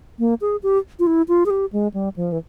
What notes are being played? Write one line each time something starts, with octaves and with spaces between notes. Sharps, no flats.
A#3
G#4
G4
F4
E4
F4
G#4
G4
G#3
G3
F3
E3